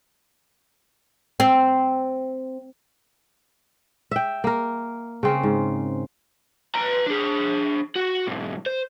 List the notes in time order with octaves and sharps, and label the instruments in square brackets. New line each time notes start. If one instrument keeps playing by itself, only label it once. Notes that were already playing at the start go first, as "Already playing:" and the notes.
[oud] C4
[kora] E5 G5
A#3 A#4
C#3 C4 C#4
G#2
[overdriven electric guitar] B4 A#5
D4 G#4
F#4
B1 G#2
C5